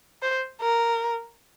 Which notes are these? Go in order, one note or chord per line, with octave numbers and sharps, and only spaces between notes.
C5
A#4